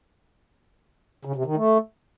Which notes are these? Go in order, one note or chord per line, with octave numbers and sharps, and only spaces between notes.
C#3
C3
D#3
A3